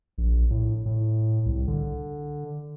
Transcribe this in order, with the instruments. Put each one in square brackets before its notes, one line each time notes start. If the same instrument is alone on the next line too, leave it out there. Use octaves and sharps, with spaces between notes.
[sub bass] A#1
A2
A2
C2
D3